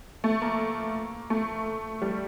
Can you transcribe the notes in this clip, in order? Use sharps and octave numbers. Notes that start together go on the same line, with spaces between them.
A3
A#3
A3
G3